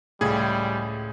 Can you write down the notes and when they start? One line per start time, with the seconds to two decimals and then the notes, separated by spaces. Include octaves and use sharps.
0.21 C#2 A2 G3 G#4 G#6